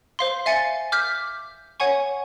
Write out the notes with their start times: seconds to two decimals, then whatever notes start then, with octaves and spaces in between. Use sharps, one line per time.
0.19 C5 F5 C6
0.46 E5 F5 G#5 A6 C#7
0.92 D6 F6 G6 B6
1.80 C#5 F#5 G#5 C#6